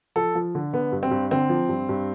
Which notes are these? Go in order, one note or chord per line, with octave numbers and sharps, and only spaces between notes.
F3 A4
F3
D3
D3 B3
G2
C4
G2
D3 C4
F3
G2
G2